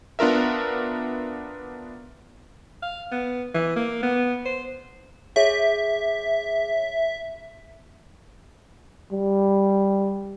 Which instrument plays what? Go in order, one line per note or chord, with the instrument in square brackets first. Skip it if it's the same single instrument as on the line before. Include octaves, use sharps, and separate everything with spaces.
[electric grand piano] B3 D4 F4 A#4 E5
[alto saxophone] F5
B3
E3
A#3
B3
C5
[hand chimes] G#4 C#5 [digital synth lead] E5
[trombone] G3